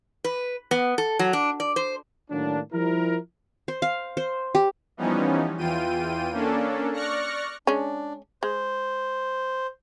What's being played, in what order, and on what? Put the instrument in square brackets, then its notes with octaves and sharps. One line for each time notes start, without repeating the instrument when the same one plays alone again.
[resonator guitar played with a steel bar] B4
B3
A4
F#3
D4
D5
C5
[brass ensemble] A2 D#3 F#3 A#3 D4
F3 G3 E4 A#4
[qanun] C5
F5
C5
G4
[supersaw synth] E3 F3 G3 B3 C#4 D#4
E2 E3 F4 G5 D#7
A#3 C#4 D4 A4
D5 C#6 F6 F#6 A#6 C#7
[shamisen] G#3 C#4 [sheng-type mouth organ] D4
[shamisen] G#3 [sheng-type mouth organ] C5